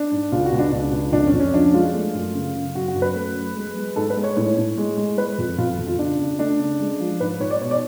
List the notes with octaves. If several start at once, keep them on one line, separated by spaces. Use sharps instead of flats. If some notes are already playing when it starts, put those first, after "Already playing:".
Already playing: D4
G#2
C#2 F4
F#4
C#2
D4
C#2 D4
C#2
F2 D4
C#4
F2
C#4
F3 D4
G#3 F4
A3
F#2
C#3
C#3
F#2 F#4
F#4
F#2
B4
A3
F#3
G#3
G#3
G#2 A4
B4
G#3
C#5
A2 C#5
A2
G#3
G#3
G#3 B4
F2
F2 F4
F2
F4
C#3 D4
C#3
A3 D4
C#3
G#3
F3
G#2 B4
G#2 C#5
D5
B2 C#5
D5